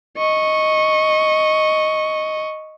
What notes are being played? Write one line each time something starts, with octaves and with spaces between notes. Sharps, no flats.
D#5 C#6